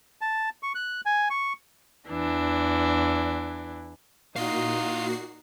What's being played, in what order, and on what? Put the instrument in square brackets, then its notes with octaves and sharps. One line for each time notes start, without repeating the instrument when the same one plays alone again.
[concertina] A5
C#6
F#6
G#5
C#6
[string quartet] E2 E3 D4
[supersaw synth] A#2 F#4 C7 [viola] D#4 [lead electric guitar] E4 F5